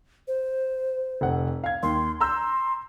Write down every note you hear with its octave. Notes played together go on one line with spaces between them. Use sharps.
C5
F1 F#5
F5 G#6
D#2 C6
A#5 C6 E6 G6